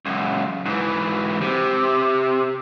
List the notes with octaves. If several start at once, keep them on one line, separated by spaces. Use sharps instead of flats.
C#2 F#2
G#2 E3
C3